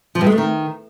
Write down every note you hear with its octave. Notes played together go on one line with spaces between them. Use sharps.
F3
G2
G#3
A3
D#3